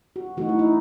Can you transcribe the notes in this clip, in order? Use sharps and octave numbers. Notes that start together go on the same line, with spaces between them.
F#4
E3 A3 D#4 F#4
E4
D#4